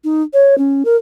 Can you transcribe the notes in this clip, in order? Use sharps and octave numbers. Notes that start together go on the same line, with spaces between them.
D#4
C#5
C#4
A#4